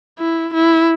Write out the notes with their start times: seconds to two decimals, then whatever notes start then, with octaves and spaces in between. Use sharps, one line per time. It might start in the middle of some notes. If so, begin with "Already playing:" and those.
0.19 E4
0.54 E4